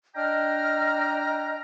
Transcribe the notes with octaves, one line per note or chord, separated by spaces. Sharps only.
D4 D#5 G5 A#5 F6